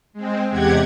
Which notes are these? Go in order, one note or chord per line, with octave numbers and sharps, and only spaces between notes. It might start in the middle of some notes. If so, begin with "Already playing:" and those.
G#3 C4
E2 C3 G#3 G4 F#5 G#6